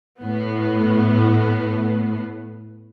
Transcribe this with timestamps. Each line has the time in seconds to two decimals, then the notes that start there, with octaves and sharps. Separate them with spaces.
0.21 A2 B3